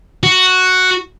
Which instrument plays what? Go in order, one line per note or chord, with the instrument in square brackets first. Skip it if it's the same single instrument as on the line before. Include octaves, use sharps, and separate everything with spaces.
[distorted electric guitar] F#4